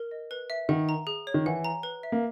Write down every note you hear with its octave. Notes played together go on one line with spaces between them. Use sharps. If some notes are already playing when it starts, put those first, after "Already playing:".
Already playing: A#4
D#5
B4
E5
D#3 F#5
A#5
G#4
C#5
D#3
E3 F#5
A#5
B4
E5
A#3